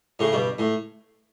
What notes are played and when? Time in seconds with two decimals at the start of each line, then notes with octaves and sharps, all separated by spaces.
0.19 A2 C#3
0.33 G2 B2
0.59 A2